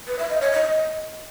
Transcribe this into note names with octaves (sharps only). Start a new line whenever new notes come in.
B4
E5
D#5
C#5
D#5